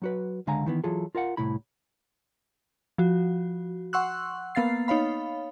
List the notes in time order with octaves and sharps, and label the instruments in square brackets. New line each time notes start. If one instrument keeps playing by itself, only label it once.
[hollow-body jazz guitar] F#3 F#4 B4
C#2 D3 G#3 F5 G#5 A#5
D#3 E3 B3
E3 F#3 F4 G#4 A4
F4 A#4 F5 F#5
C2 A2 C3 E4 B5
[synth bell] F3 F#4
F#5 C6 C#6 E6 F#6
A#3 B3 F5 A6 C7
D#4 C#5 F5 B5